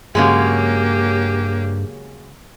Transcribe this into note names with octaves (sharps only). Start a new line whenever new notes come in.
G2 C#3 F#3 G#3 A#3 G4